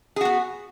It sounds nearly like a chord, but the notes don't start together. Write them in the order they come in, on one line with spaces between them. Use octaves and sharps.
G#4 F#4 B3